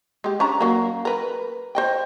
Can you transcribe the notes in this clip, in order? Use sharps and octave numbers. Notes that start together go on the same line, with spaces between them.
G#3 G4
C#4 D4 A#5
F#3 A#3
A#4 B4
C5 D#5 G5